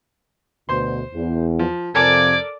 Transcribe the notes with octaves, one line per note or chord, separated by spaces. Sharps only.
D2 B2 C5 C6
E2
F3
F2 C3 A4 A#4 D5 G#5 D6 G#6